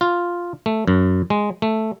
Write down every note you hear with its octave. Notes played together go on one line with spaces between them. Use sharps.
F4
A3
F#2
G#3
A3